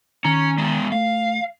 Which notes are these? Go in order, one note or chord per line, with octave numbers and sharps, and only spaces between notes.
D#3 C#4 A#5
G#3 B3
A3 F5